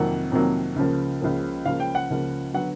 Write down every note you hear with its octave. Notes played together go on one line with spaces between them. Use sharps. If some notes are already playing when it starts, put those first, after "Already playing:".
Already playing: F2 C3 D#3 F#3 A#3 F#5
F2 C3 D#3 F#3 A#3
C#2 C#3 F3 A#3
C#2 C#3 F3 A#3
C#2 C#3 F3 A#3 F5
G5
F#5
C#2 C#3 F3 A#3
D3 F#3 B3 F#5